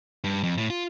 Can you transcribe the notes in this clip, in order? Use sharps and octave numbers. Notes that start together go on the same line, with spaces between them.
G2
F2
A2
F4